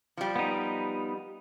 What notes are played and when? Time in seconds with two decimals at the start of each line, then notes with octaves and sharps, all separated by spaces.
0.17 F3 G3
0.36 B3 D#4